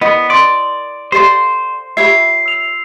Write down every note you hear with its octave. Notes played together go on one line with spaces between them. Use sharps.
B3 E4 A#4 D5 D#5
A#4 D5 C6 D#6
G4 A4 C5 D5 F5 C6
F4 G4 C#5 E5 G#5 B5 C7
E6 F7